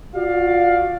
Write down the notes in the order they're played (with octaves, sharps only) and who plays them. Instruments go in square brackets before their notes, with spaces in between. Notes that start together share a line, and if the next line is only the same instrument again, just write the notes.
[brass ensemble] F4 F#4 D5 F5